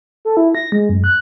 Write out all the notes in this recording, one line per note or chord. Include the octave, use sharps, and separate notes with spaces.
A4
E4
A#6
G#3
F#2
F#6